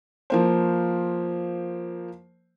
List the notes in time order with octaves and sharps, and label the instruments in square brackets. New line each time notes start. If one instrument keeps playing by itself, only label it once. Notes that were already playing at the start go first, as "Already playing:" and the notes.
[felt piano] F3 A#3 C5